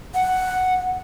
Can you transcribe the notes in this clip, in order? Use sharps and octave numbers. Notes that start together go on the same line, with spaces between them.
F#5